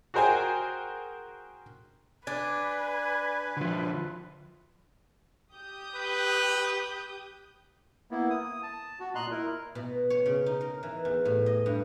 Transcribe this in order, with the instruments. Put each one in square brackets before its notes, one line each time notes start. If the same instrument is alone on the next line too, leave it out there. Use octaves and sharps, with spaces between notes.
[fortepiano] F#4 G#4 A#4 C5 G5 G#5
[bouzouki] D4 [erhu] B4 [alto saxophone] G#5
[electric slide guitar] D3 F3
[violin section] G4 D#6 G6
[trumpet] B4
[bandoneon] A#3 B3 E4
D#6
A5
F#4
A#2 D#5 A#5 C6 F#6
E4 A#4
[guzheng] B2
C#5
C#3
D#4
A#4
E3
E2
A2
D#5
G2